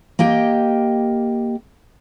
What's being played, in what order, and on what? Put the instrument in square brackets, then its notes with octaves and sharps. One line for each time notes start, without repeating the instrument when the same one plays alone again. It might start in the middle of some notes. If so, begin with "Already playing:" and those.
[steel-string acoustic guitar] A#3 G4 D#5 G5